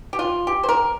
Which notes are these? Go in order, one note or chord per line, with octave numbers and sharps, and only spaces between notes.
G4
F4
G4
C5
A#4